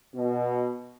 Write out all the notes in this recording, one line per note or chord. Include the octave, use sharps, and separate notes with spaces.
B2